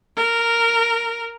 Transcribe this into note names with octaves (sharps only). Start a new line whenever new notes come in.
A#4